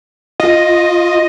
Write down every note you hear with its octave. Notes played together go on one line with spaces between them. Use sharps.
F4 D#5